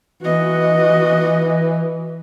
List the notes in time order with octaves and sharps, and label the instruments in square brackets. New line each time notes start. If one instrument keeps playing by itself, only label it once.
[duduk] E3 [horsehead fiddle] F#4 D#5